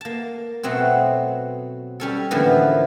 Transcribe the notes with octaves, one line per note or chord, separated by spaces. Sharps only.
A#3 A5
B2 F#3 A3 C4
G3 C#4 A4
A2 D3 E3 F3 A#3 B3